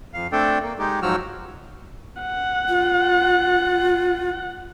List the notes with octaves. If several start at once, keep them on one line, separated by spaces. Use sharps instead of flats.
F2 F5
A3 C4 D4 A4 D5 G5
A#3
G#3 D#4 G4
G#2 F3 F#3 F#4 E6 F6
F#5
F4